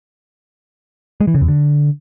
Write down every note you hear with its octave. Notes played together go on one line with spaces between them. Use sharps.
G#3
E3
C#3
E2
D3